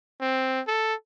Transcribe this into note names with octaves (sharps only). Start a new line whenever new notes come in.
C4
A4